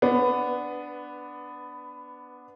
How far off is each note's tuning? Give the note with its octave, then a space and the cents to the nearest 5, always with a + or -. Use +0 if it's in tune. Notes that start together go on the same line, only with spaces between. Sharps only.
B3 +0 D4 +0 B4 +15